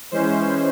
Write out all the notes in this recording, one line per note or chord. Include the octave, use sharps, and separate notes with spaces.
E3 G#3 C#4 C5